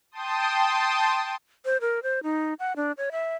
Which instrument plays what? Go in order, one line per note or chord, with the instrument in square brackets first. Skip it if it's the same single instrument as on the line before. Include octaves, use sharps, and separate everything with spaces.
[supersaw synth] G5 A5 C6 D#6
[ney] C5
A#4
C5
D#4
F#5
D4
C#5
E5